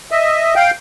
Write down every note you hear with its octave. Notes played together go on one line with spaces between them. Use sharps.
D#5 E5
F5 G5